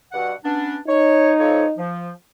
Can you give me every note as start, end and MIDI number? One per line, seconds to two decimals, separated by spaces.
0.12 0.33 43
0.12 0.33 47
0.12 0.33 78
0.44 0.78 59
0.44 0.78 61
0.44 0.78 62
0.88 1.78 63
0.88 1.32 73
1.39 1.64 53
1.39 1.64 69
1.39 1.64 73
1.78 2.10 53